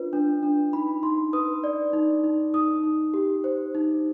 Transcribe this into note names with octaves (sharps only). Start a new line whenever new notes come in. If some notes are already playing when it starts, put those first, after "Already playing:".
Already playing: D4 F4 B4
D4
D4
D#4 B5
D#4 C6
B4 D#6
D5
D#4
D#4
D#4 D#6
D#4
G4
C5
D#4